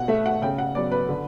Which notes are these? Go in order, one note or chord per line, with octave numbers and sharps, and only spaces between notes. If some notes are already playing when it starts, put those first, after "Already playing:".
Already playing: B2 F#5
A3 E5
F#5
C#3 G5
F#5
F#3 B3 D5
B4
D3